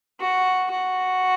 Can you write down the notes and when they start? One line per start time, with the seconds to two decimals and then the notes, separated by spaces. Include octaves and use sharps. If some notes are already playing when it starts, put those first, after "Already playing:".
0.20 F#4
0.71 F#4